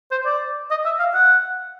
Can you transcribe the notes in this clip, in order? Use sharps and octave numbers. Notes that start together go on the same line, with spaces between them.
C5
D5
D#5
E5
F5
F#5